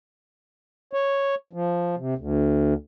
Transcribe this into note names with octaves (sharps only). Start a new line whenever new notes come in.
C#5
F3
C3
D2